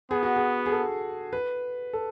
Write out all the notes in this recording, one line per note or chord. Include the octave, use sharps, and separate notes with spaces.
B3 G#4
F#4
G#4
G#4
A4
B4
A4